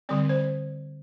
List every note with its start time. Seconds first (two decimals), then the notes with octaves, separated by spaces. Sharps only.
0.09 D3 G3 C4 D5
0.29 C5